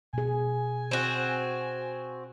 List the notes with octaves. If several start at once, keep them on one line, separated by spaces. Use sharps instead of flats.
B2 G#4 G#5
C4 F#4